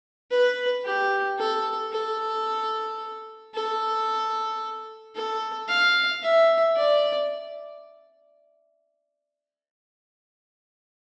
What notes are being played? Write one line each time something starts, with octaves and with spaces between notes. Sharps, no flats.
B4
G4
A4
A4
A4
A4
F5
E5
D5